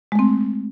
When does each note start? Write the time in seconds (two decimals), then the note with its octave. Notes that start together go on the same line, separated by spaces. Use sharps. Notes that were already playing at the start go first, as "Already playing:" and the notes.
0.12 G#3
0.15 A3
0.19 C4